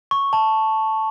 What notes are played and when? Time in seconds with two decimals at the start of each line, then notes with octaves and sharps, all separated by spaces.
0.11 C#6
0.33 A5